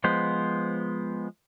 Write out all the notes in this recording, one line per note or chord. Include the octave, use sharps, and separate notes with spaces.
F3 G#3 B3 C5